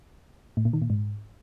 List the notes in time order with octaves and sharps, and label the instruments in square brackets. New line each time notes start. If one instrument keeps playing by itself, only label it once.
[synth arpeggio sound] A2
A#2
D#3
A#2
G#2